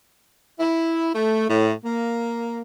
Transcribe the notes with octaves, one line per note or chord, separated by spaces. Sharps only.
E4
A3
A2
A#3